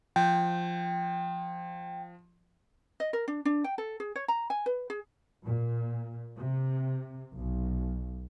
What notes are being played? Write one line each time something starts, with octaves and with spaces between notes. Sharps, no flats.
F3 G5
D#5
A#4
D4
D4
G5
A4
G#4
C#5
A#5
G#5
B4
G#4
A#2
C3
B1